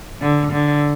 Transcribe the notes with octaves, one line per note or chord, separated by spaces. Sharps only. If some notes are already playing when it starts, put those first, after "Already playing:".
D3
D3